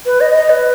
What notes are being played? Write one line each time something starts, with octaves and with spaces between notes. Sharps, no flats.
B4
D#5
D#5
B4